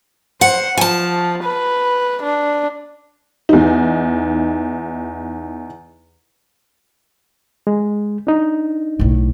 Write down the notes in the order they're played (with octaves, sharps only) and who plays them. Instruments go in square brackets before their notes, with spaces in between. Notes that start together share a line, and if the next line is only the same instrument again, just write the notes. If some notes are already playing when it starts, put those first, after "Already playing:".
[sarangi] C5 [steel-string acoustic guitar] F#5
[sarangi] F3 [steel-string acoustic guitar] G#5 A5
[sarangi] B4
D4
[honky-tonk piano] E2 D#4
[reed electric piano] G#3
D4 D#4
[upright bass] B1 A2